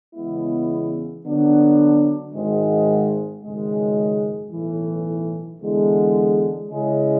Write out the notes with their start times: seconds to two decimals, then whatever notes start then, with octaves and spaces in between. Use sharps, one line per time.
0.14 E2 C#3 G#3 B3 E4
1.24 D3 F#3 B3 D4
2.32 G#1 G#2 G#3
3.42 G#1 F#2 C#3 G#3
4.50 B1 A2 E3
5.59 E2 D3 G#3
6.69 C#3 G#3 C#4 E4 G#4